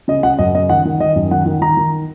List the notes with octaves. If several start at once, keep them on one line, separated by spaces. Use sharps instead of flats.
C#3 D#5
C#3 F#5
F#2 D#5
C#3 D#5
D#3 F#5
D#3
D#3 D#5
F#2
D#3 F#5
D#3
D#3 A#5
D#3